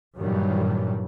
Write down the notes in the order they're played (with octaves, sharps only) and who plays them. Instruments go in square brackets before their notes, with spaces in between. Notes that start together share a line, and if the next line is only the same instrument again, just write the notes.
[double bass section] G2 A#2 D#3 E3 F#3 G3